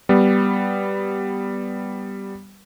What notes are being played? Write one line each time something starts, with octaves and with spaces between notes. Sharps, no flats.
G3 B3